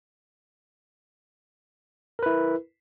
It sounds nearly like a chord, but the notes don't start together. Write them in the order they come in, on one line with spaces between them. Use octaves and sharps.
A#4 B4 E4